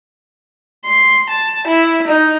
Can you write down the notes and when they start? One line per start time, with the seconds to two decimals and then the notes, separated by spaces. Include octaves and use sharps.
0.85 C6
1.30 A5
1.67 E4
2.07 D#4